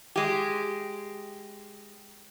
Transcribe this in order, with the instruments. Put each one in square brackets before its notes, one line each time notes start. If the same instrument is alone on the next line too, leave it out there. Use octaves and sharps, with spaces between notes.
[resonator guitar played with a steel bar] G#3 G4